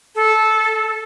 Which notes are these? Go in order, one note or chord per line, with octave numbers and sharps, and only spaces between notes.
A4